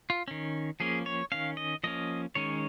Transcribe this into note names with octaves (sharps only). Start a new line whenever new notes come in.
F4
D#3 C#4
F3 A#3 C#4 G#4
C#5
D#3 C#4 F5
D#5
F3 A#3 C#4 D#5
D#3 G#3 C#4 C#5